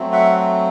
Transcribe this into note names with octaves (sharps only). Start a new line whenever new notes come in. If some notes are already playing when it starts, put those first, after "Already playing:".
Already playing: F#3 A3 C4
E5 F#5